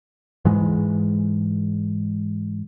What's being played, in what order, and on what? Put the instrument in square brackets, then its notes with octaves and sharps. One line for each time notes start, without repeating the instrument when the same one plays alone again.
[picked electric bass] G#2 E3 G#3